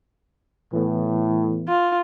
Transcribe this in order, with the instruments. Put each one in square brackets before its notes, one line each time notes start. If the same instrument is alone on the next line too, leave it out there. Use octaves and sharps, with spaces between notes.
[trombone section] A2 [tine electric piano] E3 B3
[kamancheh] F4